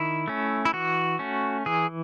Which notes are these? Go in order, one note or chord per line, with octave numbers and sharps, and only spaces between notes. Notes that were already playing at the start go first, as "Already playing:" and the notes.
Already playing: D#3 E4
A3 C#4
E4
E3 F#4
A3 C#4
E3 G#4